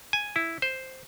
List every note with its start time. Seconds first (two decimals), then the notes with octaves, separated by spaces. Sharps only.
0.13 G#5
0.36 E4
0.62 C5